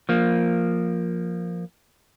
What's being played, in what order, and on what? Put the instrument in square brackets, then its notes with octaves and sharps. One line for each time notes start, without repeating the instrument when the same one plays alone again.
[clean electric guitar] F3 A#3